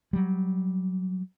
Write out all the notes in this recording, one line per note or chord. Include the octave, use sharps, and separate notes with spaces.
F#3 G3